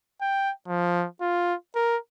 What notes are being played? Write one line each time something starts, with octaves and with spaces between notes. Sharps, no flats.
G5
F3
F4
A#4